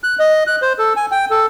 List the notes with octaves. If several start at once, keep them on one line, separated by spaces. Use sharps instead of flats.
F#6
D#5
F#6
C5
A4
G#5
G5
A4